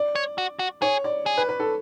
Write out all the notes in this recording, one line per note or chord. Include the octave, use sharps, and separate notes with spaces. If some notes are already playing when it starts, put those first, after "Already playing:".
Already playing: D5
C#5
F#4
F#4
G#4 C#5
D5
G#4
B4
B4
A4